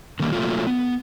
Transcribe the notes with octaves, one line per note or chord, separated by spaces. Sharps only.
D3 D#3 G3 A#3
F#3 A3 A#3 F4
B3